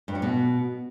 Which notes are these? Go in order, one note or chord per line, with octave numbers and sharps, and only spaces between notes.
G2
F#3
B2